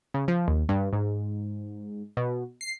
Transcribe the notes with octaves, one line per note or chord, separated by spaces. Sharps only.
C#3
F3
D#2
G2
G#2
B2
C7